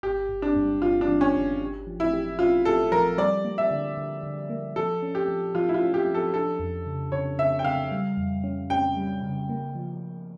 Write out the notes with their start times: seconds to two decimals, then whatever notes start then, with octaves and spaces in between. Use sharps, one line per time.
0.03 G1 G4
0.29 G1
0.42 D4
0.55 G2
0.82 G1 F4
1.01 D4
1.08 E3
1.21 C#4
1.34 G1
1.61 G4
1.87 F3
2.00 E4
2.13 G4
2.39 C#4 F4
2.65 G4 A4
2.92 F3 A#4
3.18 G3 D5
3.44 A#3
3.58 E5
3.71 D3
3.97 D3
4.23 D3
4.49 A#3
4.76 F3 A4
5.02 C#4
5.15 G4
5.28 F3
5.55 F3 F4
5.69 E4
5.74 F4
5.81 C#4
5.94 G4
6.07 F3
6.14 A4
6.34 D4 A4
6.59 F2
6.86 C#3
7.12 C#3 C#5
7.39 C#3 E5
7.59 G5
7.64 C#3 F5
7.91 G3
8.17 F2
8.44 C#4
8.70 C#4 G5
8.97 G3
9.22 C#3
9.49 A#3
9.75 F3